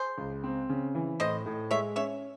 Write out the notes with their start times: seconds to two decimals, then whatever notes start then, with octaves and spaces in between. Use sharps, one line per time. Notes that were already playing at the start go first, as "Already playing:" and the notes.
Already playing: G#4 C5
0.18 C#2
0.44 C4
0.69 C#3
0.95 E3
1.20 A2 C5 D#5
1.46 A2
1.71 G#3 C#5 E5
1.96 C#4 C#5 E5